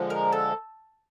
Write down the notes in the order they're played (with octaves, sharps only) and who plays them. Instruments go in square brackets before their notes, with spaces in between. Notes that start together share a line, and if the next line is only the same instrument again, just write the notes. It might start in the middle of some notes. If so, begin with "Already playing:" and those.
Already playing: [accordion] D3 F3 G#3
[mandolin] A#4
A4